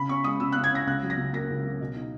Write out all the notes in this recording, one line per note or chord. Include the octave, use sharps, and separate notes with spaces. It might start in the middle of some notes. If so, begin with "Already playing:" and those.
Already playing: C#3 B5
C#4 C#6
G#3 D#6
C#3 E6
F#6
C#3
G#6
C#4 A#6
C#2 F#6
F#3
A#6
C#3
A#3 A#6
C#2
F#3
B2
D#4